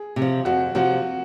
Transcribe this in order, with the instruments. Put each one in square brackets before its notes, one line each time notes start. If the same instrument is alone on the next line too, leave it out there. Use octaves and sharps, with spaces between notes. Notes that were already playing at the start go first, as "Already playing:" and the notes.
Already playing: [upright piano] G#4
[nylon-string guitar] C3
F3
[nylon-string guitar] F2 [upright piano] F#4
[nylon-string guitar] C3 F3 [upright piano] F#4